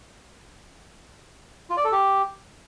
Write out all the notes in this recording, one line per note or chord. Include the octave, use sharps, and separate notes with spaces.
F4
D5
A4
G4